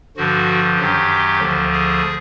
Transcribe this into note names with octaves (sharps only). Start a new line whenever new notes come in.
G2 D3 F3 F#4
F#2 D#3 F#3 G4
D2 D3 F3
G#4